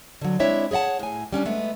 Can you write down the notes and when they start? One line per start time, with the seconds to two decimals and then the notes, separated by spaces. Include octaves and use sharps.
0.21 D3 F#3
0.39 G#3 C4 D4 E4 C#5 E5
0.71 G#4 C#5 D#5 F#5 A5
0.99 A2 G#5
1.33 G3 C#4 D4
1.45 G#3 A3 B3